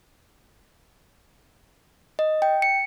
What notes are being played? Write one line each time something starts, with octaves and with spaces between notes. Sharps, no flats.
D#5
G5
C#7